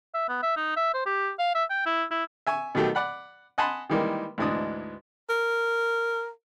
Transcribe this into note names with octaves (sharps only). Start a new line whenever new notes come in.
E5
B3
E5
D#4
E5
C5
G4
F5
E5
G5
E4
E4
E5 G#5 C#6
B2 D#3 F#3 A3 G4
D5 F#5 B5
D#5 F#5 G#5 A5 B5 C6
D#3 E3 G3 G#3 A#3
D2 G#2 E3 G#3 D4 D#6
A#4